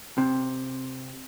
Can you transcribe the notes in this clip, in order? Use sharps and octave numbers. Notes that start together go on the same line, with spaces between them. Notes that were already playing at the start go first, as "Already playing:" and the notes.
C3